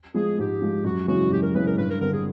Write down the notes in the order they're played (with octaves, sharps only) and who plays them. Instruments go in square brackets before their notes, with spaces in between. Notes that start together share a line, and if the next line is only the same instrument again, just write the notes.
[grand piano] F3 G#3 [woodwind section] G#4
[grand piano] G#2 [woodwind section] G4
[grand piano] F3 G#3
[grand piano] F#2 [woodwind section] F#4
[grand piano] C#3 E3 G#3 C#4 [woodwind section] F#4
[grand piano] F#2 [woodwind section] G4
[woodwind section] A#4
[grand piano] C#3 E3 G#3 C#4 [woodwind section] B4
[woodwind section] A#4
[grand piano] G2 [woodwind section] B4
[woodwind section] A#4
[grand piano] D3 G3 C4 [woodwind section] A#4
[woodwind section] G#4